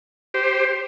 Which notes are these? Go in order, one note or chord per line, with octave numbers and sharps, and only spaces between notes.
G4 C5